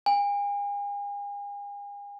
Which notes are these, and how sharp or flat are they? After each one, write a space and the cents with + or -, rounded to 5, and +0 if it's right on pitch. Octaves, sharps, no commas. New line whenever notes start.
G#5 -40